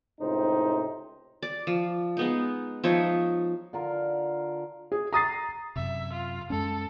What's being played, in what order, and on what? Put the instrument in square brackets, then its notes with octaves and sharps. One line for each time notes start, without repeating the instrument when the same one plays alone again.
[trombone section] C#2 A2 C3 D#4 C5
[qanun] D5
F3
G#3 B3 D#4
F3 D#4 C#5 E5
[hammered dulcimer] D3 F4 A#4
[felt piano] G#4
A#5 D#6 A6 C7
[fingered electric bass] F#2 C3 [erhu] E5
[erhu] F4
[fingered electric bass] F#2 G#3 C#4 [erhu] A4